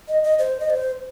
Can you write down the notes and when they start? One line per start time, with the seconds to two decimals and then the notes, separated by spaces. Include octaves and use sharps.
0.08 D#5
0.24 D#5
0.39 C5
0.60 D#5
0.70 C5